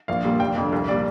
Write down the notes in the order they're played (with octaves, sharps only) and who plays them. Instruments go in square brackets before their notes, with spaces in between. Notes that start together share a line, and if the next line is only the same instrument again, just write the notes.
[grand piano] A#1 F5
A#2 G3
F1 G5
F2 D3
C2 F5
A#2 G3 D5